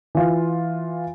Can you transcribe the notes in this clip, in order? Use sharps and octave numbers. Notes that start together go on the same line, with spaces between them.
E3 F4